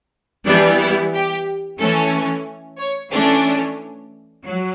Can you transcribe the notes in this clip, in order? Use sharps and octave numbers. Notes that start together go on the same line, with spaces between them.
E3 G3 B3 D4
E4
G4
E3 A3 C#4 A4
C#5
E3 A3 C#4 D4
F#3